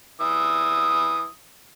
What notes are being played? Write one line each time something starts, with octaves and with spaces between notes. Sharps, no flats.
E3 E5 D#6